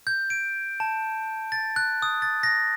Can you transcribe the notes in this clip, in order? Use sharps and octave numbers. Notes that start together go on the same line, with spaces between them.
G6
D7
A5
A6
F#6
D#6
A6
A#6